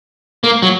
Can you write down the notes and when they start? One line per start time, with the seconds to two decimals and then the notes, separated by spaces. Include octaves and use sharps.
0.44 A#3
0.62 F#3